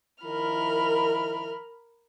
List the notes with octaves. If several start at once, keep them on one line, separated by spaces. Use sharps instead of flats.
D#3 F3 E4 A#4 B5 F6